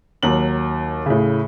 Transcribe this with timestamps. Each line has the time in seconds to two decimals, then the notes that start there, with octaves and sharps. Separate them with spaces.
0.23 D#2 F#3 F#7
1.06 A2 C#3